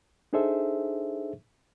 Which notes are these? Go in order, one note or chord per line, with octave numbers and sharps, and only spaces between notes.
D4 D#4 G#4 A4 C5 E5